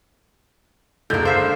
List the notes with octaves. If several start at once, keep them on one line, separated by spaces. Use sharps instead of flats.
F#1 D3 G#3 A#3 G6
C5 E5 F5